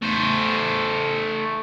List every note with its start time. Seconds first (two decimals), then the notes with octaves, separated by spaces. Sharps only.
0.02 A3 C5